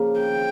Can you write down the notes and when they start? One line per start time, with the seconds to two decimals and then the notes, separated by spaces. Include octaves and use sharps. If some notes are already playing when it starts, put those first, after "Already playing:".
Already playing: C#3 F3 A#3
0.20 G5